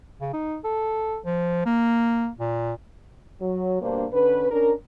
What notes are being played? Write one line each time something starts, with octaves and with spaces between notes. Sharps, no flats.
C#3
D#4
A4
F3
A#3
A#2
F#3
G2 B2 A#3 D4 C5
D3 C#4 B4
C#4 D4 A#4